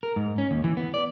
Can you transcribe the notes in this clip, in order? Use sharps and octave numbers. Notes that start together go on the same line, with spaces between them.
A#4
G#2
C#4
D#2
E3
B3
D5